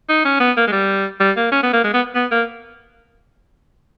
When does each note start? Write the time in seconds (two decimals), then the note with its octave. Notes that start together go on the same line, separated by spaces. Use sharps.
0.09 D#4
0.25 C#4
0.40 B3
0.57 A#3
0.67 G#3
0.72 G3
1.20 G3
1.37 A#3
1.52 C#4
1.63 B3
1.73 A#3
1.84 G#3
1.94 B3
2.15 B3
2.32 A#3